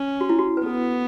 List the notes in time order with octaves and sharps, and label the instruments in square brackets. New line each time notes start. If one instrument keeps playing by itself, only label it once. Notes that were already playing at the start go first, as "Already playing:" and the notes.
Already playing: [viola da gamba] C#4
[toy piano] F#4
E4
F#4
B4
[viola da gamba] B3 [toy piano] A4